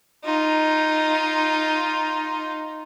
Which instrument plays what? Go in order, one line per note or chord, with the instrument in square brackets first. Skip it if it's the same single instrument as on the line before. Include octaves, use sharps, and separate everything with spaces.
[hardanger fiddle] D#4 F4